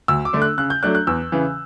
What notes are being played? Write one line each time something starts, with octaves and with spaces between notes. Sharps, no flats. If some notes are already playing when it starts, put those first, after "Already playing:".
D2 E6
D6
D3 A3 D4
F#6
C#3 F#6
G6
F#3 A3 D4 F#6
F#6
E2 E6
C#3 E3